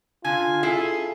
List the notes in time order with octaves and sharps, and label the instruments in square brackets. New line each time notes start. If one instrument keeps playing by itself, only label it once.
[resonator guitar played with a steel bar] D3 [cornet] F4 [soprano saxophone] G#5
[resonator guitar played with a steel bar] E4 A4 F5 [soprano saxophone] G#4